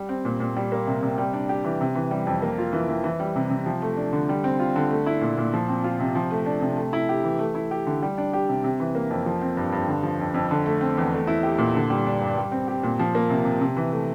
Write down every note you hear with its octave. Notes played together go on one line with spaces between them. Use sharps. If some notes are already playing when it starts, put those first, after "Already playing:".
Already playing: G3
C4
A#2
A#2
G3
A#3
C3
C3
G3
D4
G4
E3
C3
E3
G3
F2
A#3
F4
E3
E3
E3
G3
C3
C3
F3
A3
D4
D3
G3
C4
F4
D3
A3
E4
A#2
A#2
F3
C4
F4
C3
F3
A3
D4
C3
A3
E4
G4
E3
A3
E4
G4
D3
G3
D4
G4
C3
C3
E3
A#3
F2
F3
C4
G2
G2
D3
F3
F2
F2
D3
A3
C4
E2
A3
E4
G4
A#2
D3
G3
D4
G2
G3
C4
G4
A#2
F3
A#3
C3
C3
C3
E3
A3